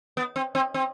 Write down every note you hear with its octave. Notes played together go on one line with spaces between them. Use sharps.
B3
C4
C4
C4